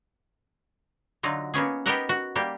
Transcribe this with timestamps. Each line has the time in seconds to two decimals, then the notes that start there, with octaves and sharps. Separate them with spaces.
1.23 D3 F#3 D#4 F4
1.54 A#3 B3 C#4 G#4
1.86 B3 D#4 G4 A#4 D#5 F#5
2.09 F#4
2.36 G3 A#3 G4